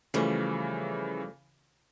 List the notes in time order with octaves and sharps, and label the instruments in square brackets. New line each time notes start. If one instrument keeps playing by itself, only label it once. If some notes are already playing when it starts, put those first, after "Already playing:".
[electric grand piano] C#3 E3 [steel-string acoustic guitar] F3 G3 A3